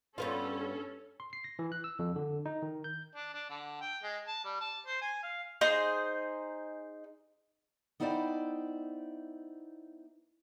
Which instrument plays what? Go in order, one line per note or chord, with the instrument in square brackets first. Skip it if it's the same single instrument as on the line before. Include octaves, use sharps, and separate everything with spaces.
[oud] G2 B3 F4 [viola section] C#4 A4
[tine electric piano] C6
C7
A#6
E3
F#6
E6
F2
D3
D#4
D#3
G6
[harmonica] D4
D4
D3
G5
G#3
A5
G3
A5
C5
G#5
F5
[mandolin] D#4 G#4 C5
[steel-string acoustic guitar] B3 D#4 E4 C5 D5 G5